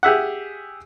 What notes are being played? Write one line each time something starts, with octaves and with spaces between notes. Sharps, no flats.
G4 G#4 E5 F#5